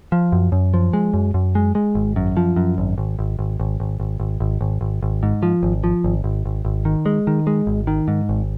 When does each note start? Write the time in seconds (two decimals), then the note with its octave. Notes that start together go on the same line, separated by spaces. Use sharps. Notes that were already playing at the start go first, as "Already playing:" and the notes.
0.12 F3
0.32 F#2
0.52 F#2
0.74 F3
0.93 G#3
1.14 F#2
1.34 F#2
1.55 G#3
1.75 G#3
1.95 G#1
2.16 F#2
2.37 F3
2.56 F#2
2.78 G#1
2.98 G#1
3.19 G#1
3.39 G#1
3.60 G#1
3.80 G#1
4.00 G#1
4.20 G#1
4.40 G#1
4.61 G#1
4.81 G#1
5.03 G#1
5.23 G#2
5.43 F3
5.63 G#1
5.84 F3
6.04 G#1
6.24 G#1
6.46 G#1
6.65 G#1
6.85 D#3
7.06 G#3
7.27 D#3
7.47 G#3
7.67 G#1
7.87 D#3
8.08 G#2
8.29 G#1